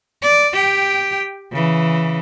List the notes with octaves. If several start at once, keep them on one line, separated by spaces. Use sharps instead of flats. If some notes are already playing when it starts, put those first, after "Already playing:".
D5
G4 G5
C#3 E3